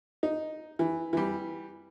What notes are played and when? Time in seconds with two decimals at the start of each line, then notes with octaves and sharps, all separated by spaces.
0.23 D#4
0.79 E3
1.13 E3 G3